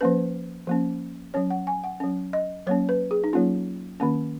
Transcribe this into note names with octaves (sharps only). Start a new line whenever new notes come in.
F3 A#3 C#4 B4
F3 A#3 C#4
F#3 C#4 C#5
F#5
G#5
F#5
F#3 C#4
D#5
F#3 A#3 C#4 C#5
B4
G#4
D#4
F#3 A#3 C#4 F4
D#3 A#3 C#4